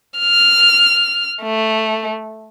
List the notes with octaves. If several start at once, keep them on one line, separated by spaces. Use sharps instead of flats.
F6
A3